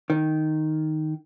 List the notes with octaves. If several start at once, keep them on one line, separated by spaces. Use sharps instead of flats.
D#3